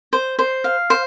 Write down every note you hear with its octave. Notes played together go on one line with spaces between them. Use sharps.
C5
C5
F5
C5